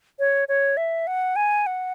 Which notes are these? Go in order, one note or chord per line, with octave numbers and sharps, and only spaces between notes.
C#5
C#5
E5
F#5
G#5
F#5